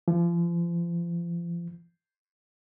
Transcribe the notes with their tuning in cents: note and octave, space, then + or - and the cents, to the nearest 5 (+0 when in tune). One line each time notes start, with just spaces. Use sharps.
F3 -35